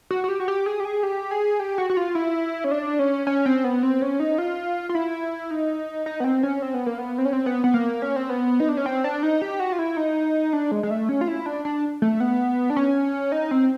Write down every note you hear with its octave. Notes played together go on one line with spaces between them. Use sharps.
F#4
F#4
G4
F#4
G4
G#4
G4
G#4
G4
G#4
G4
F#4
F#4
F4
E4
C#4
D4
C#4
C#4
C4
B3
C4
C#4
D#4
F4
F4
E4
D#4
D#4
B3
C4
C#4
C4
B3
A#3
B3
C4
C#4
C4
B3
B3
A#3
C#4
C4
B3
D#4
D4
C#4
C4
D4
D#4
G4
F#4
F4
E4
D#4
D4
G#3
G#3
A3
C#4
F4
E4
D4
D4
A3
B3
D4
C#4
D#4
C4